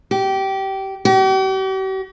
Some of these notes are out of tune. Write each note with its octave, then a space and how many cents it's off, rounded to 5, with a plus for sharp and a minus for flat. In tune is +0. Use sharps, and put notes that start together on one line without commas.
G4 -20
G4 -45